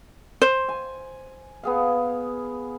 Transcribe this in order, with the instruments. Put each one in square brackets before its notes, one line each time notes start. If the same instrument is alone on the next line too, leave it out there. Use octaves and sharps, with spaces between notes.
[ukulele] C5
[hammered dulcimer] G#5
B3 G#4 F5